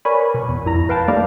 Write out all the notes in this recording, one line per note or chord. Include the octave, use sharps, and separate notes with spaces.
A#4 B4 C#5 D5 G#5 B5
B2
E2
G#1 F2 E4 A#5
B4 F5 G5 A5
G3 A3 A#3 D#4 D5 F5